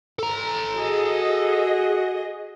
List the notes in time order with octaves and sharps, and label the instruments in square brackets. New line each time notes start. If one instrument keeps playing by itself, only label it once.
[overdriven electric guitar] A4 A#5
[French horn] F#4 [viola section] G#4 D#5